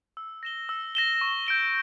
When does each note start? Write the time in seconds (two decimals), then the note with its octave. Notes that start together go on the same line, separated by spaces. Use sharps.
0.17 E6
0.43 A#6 E7 G7
0.69 E6
0.95 A#6 E7 G7
1.21 C#6
1.47 G6 D7 G7